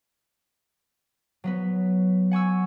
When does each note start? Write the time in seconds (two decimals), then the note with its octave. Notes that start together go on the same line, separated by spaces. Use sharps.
1.44 F#3 B3 B4
2.31 F#5 G#5 C#6 E6